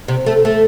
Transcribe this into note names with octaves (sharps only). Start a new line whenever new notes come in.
C3
A3
A3